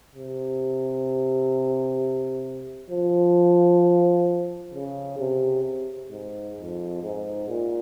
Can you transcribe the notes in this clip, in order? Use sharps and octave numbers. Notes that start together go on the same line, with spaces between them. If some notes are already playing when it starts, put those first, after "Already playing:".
C3
F3
C#3
C3
G#2
F2
G#2
A#2